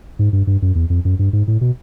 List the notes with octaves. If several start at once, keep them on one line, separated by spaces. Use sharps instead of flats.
G#2
G2
G2
F#2
E2
F2
F#2
G2
G#2
A2
B2